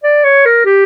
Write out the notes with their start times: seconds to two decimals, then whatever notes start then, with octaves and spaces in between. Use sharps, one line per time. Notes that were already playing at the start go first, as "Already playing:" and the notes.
0.03 D5
0.24 C#5
0.45 A#4
0.65 G4